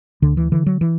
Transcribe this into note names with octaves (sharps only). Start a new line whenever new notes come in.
D2 D3
E3
D3 E3
F#3
E3